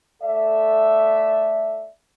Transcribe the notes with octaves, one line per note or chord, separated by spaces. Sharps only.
A3 A4 D5 E5